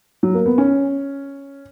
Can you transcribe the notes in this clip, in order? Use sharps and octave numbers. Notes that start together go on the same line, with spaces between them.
F#3
A#3
B3
C#4